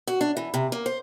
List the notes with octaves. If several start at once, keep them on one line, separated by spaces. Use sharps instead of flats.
F#4
D4
E3
C3
A#3
C5